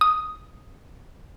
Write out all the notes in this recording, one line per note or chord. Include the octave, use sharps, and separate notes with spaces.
D#6